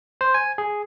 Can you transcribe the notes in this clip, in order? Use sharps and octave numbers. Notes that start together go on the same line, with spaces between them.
C5
G#5
G#4